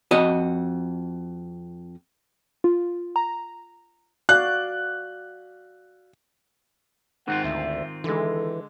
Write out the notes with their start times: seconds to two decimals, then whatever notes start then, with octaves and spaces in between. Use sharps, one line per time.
0.11 F2 F#4 D#5
2.64 F4
3.16 A#5
4.29 F#4 D5 F5 F#6
7.28 G#2 D#3 C4 F4 F#5
7.44 D2 E5
8.04 D3 E3 G#3 A4